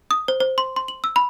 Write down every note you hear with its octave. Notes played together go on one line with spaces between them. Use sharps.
D#6
C5
C5
C6
C6
F#7
E6
B5